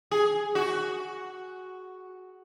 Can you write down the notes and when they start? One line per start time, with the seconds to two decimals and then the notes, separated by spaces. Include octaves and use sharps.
0.11 G#4
0.55 F#4